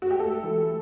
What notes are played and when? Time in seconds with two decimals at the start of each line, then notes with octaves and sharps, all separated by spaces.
0.02 F#4
0.11 G4
0.19 A3 A4
0.44 E3